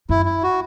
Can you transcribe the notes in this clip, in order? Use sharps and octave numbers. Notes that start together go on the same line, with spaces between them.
F#2 E4
E4
F#4